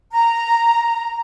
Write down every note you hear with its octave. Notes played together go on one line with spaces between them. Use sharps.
A#5